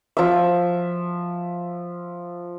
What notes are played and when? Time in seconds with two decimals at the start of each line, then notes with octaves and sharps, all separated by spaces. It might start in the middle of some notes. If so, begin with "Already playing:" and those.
0.17 F3 E5